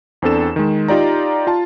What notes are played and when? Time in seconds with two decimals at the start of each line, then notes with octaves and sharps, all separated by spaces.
0.22 E2 C4 D4 A4 E7
0.56 D#3 G#3
0.88 D#4 F4 G4 D5 A#5
1.47 F4 A5